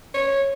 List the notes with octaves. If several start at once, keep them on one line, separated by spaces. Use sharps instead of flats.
C#5